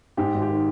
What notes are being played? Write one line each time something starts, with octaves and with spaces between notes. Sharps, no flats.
G#2 G4
G#1
G4
D#3